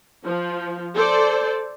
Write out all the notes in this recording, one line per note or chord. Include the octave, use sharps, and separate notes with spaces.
F3
A4 C5 D5